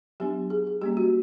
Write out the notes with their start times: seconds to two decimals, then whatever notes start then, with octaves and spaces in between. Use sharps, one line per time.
0.20 F#3 B3 D4 G4
0.50 G#4
0.67 G#4
0.82 G3 A#3 C#4 G4
0.97 F#4